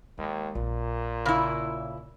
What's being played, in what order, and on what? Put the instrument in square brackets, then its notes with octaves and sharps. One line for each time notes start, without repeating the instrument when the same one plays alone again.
[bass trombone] D#2 [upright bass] G#3
[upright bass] A#1 [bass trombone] A#2
[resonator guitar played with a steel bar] C#3 E4